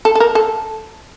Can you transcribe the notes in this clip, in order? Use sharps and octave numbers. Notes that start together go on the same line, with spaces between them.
A4
A4
A#4
A4